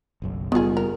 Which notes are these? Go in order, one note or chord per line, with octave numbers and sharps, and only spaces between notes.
F#1 B1 F#2
F#1 D#3 G3 B3 F4 G#4
A#4